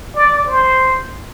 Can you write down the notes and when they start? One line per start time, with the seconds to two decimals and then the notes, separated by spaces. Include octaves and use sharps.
0.15 D5
0.47 C5